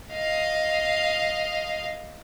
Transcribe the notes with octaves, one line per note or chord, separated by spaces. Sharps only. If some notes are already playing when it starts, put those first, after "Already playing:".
D#5 F5